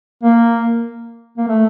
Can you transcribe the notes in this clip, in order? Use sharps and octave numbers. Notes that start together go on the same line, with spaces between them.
A#3
A#3
A3